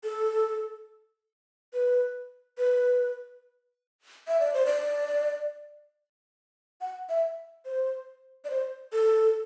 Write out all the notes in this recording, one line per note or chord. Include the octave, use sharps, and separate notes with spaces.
A4
B4
B4
E5
D5
C5
D5
F#5
E5
C5
D5
C5
A4